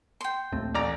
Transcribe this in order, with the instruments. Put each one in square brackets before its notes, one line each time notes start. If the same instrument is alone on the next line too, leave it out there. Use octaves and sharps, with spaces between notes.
[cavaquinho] G5 C6
[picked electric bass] A#1 A3 C4 [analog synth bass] D#2
[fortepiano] A1 D5 A#5